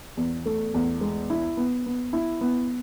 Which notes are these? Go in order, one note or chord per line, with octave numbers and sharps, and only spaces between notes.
E2
A3
E2
G#3
E4
B3
B3
E4
B3